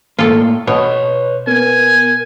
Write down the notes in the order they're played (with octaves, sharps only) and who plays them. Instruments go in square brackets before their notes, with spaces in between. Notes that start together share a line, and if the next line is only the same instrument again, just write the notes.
[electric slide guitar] A2 A#3 [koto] F4 A4
[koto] B2 [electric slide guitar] B4 C#5
[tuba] B3 [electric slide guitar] A#4 [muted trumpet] G#5